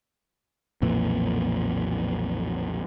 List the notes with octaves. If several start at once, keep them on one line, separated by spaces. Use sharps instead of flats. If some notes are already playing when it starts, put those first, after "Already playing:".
B1 F2 A#2 E3